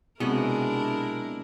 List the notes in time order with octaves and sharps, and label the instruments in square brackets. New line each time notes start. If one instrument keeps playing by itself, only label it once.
[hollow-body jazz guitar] B1 C3 [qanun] G#3 F#4 [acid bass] B3 [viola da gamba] D4 E4 A#4